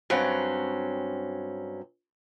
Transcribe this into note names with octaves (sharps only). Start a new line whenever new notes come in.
G2 F#3 C4 C#4